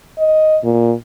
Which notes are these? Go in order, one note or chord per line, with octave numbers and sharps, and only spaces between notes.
D#5
A#2